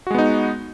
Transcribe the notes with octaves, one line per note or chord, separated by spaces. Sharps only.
G#3 B3 D#4 F#4